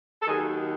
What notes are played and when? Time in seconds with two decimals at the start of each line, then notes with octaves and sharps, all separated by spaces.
0.22 A4
0.26 D#2 D#3 F#3 G#4